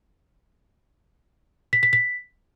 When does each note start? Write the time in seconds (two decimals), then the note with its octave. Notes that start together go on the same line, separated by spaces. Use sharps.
1.73 B6
1.83 B6
1.93 B6